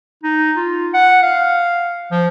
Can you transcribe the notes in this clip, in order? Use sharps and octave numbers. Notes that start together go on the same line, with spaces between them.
D#4
F4
F#5
F5
F3